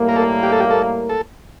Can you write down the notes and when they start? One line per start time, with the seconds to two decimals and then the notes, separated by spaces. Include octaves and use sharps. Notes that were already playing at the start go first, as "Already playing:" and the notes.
Already playing: A2 G3 A#3
0.09 A#4
0.16 A4
0.43 G4
0.52 A4
0.60 G4
0.70 A4
1.09 A4